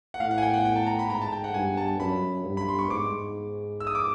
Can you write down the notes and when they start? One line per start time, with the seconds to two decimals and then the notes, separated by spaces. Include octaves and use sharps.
0.14 F#5
0.20 A2 F5
0.31 F#5
0.38 G#5
0.43 G5
0.54 F#5
0.65 G5
0.76 A5
0.87 A#5
0.99 B5
1.09 G#2 A#5
1.22 A5
1.32 G5
1.44 F#5
1.54 G2 G#5
1.77 A5
1.99 F#2 B5
2.45 G2
2.57 B5
2.69 C6
2.79 C#6
2.90 G#2 D6
3.80 E6
3.87 D#6
3.95 D6